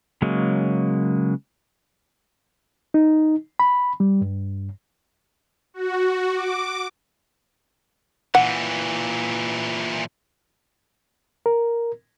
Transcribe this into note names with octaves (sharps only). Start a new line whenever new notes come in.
C#3 F#3 G#3 A#3
D#4
B5
G3
G2
F#4
D6
A#2 E3 F#5
A#4